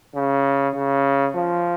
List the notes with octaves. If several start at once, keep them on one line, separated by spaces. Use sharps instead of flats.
C#3
C#3
F3